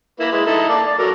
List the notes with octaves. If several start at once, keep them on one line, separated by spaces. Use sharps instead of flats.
A#3 E4 B4
G#3 E4
D#4 E4 A4
A#3 D5 A5
D5
F#3 A4 A#4